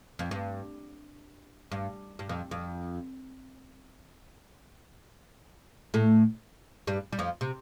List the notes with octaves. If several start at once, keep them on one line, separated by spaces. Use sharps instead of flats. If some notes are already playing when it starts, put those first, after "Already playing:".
F2
G2
G2
G2
F2
F2
A2 A3
G2 G3
G3
F2 F3
C3